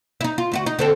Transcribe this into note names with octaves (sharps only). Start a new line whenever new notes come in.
D#4 E4
F4
D2 E4 F#4
D#4
D3 C4 A4